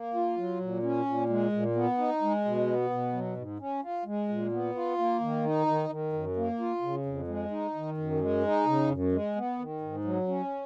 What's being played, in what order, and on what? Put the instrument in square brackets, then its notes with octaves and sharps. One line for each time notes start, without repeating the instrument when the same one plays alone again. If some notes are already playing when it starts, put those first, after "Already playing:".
Already playing: [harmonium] A#3
F4
F#3
A#2
C#4
A#2
G#3
A#2
B3
D#4
G#3
B2
B3
B2
F#3
G#2
C#4
F4
G#3
A#2
B3
F4
A#3
D#3
D#4
D#3
D#3
F#2
A#3
F4
C#3
F2
G#3
D#4
D#3
F#2
G#3
D#4
C#3
F#2
G#3
B3
D#3
G#2
F#3
C#4